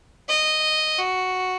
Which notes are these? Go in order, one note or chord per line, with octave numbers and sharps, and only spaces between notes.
D#5
F#4